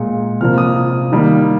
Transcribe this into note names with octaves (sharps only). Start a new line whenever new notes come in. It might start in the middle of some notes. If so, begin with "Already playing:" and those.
Already playing: A#2 G#3
C3 F3 A#3 F6
D#6
D#3 G3 A#3